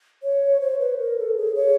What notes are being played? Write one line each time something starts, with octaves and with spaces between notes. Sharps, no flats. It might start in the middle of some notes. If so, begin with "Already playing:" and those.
C#5
C5
B4
A#4
A4
G#4
C#5